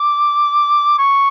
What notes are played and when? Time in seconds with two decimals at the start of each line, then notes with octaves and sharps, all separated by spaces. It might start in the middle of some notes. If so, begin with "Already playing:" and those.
Already playing: D6
0.98 C#6